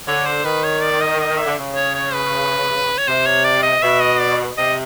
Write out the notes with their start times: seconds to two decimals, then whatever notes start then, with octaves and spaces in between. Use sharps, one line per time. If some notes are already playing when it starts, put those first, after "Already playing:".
0.07 D3 C#5
0.26 C5
0.44 D#3 B4
0.64 C#5
0.82 D5
1.01 D#5
1.20 D#5
1.39 E5
1.46 D3
1.58 C#3
1.76 C#5
1.95 C#5
2.14 B4
2.98 C#5
3.07 C3 C5
3.26 C#5
3.45 D5
3.63 D#5
3.82 B2 E5
4.01 D#5
4.20 D5
4.57 C3 D#5